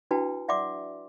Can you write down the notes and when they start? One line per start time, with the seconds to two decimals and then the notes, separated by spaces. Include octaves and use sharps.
0.11 D4 E4 F#4 B4 G5 A5
0.48 D5 E5 F#5 C6 D6